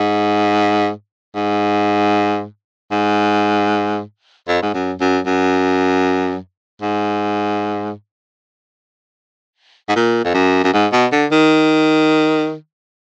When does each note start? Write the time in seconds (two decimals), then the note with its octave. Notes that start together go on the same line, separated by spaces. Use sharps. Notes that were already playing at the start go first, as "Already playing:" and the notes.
Already playing: G#2
1.35 G#2
2.91 G#2
4.48 F2
4.62 G#2
4.74 F#2
5.00 F#2
5.26 F#2
6.82 G#2
9.89 G#2
9.95 A#2
10.24 F2
10.35 F#2
10.64 F#2
10.73 G#2
10.92 B2
11.12 D3
11.32 D#3